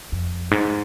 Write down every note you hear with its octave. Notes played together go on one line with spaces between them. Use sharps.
F2
G#2